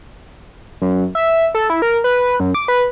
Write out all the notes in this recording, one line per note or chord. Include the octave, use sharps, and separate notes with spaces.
F#2
E5
A4
E4
A#4
B4
F#2
D6
B4